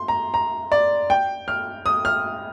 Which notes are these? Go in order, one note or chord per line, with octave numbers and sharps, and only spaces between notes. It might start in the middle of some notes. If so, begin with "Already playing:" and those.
Already playing: C6
A#5
A#5
D5
G5
F6
D#6
F6